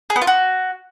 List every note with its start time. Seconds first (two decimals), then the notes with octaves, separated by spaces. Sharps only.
0.10 G#4
0.16 B3
0.22 F4
0.27 F#4